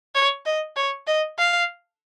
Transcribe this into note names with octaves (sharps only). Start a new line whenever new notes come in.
C#5
D#5
C#5
D#5
F5